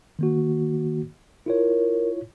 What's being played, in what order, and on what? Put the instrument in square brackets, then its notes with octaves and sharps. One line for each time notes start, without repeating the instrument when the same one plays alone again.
[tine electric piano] D#3 A#3 F#4
[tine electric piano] E4 F4 C#5 [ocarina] A#4